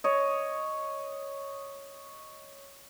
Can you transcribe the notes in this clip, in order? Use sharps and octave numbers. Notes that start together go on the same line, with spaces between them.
C#5 D#5